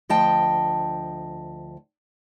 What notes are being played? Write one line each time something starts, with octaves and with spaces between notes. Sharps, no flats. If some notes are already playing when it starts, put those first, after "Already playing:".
D2 F3 D#5 G5 A5